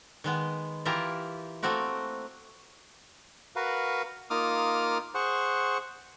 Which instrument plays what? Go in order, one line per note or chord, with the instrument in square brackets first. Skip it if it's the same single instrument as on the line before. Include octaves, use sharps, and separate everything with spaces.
[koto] D#3 G#3 B3
E3 E4 F4 G4 A#4 A#5
A3 A#3 C4 F#4 A#4
[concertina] F#4 A#4 B4 F5
A#3 D#4 F4 D6 D#6 F6
G#4 C5 F#5 C#6